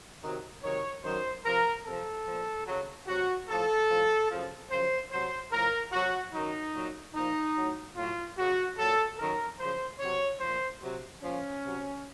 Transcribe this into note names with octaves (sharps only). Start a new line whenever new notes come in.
C3 D#3 F#3
C3 D#3 F#3 C#5
F#2 D#3 F#3 C5
C3 F3 A#4
C3 F3 A4
A#2 F3
F#2 C#3 F#3
C3 F#3 F#4
A2 F3 A4
A2 F3
F#2 C#3 F3
F#2 C#3 F3 C5
C3 F#3 C5
A2 F3 A#4
C3 F#3 F#4
F#2 D#3 F#3 D#4
A#2 F#3
A#2 F3 D#4
A2 F#3
A2 F#3 F4
F#2 C#3 F#3 F#4
A#2 F#3 A4
F#2 D#3 F#3 A#4
F#2 C#3 F3 C5
C3 F#3 C#5
A#2 F3 C5
C3 F#3
A#2 F3 C#4
C3 F#3